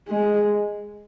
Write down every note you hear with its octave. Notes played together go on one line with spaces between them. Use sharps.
G#3